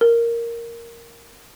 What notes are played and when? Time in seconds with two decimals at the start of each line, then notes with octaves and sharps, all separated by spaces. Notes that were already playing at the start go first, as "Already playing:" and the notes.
0.01 A#4